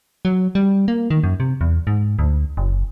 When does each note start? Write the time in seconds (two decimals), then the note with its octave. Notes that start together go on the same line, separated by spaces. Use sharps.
0.25 F#3
0.55 G3
0.88 A#3
1.10 D#3
1.23 F#2
1.40 C3
1.61 E2
1.87 G#2
2.19 D2
2.57 F#1